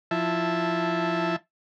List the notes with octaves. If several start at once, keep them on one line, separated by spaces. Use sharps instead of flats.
F3 E4 E5 A5